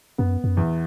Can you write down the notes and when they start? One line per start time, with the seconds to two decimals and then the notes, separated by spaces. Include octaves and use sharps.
0.18 F#2 B3
0.44 F#2
0.57 E2